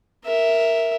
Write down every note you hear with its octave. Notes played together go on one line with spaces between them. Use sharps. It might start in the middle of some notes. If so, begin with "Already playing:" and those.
A#4 E5